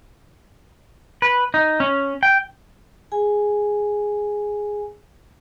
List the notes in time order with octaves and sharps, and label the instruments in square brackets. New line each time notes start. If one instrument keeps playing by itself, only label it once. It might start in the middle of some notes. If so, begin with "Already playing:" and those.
[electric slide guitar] B4
D#4
C#4
G5
[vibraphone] G#4 G#5